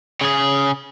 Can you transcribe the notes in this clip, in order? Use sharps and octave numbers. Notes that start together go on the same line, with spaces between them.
C#3 G#4